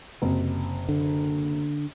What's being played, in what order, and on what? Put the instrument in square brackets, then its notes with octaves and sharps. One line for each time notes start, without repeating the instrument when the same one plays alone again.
[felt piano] F#1 C3
[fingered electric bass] D3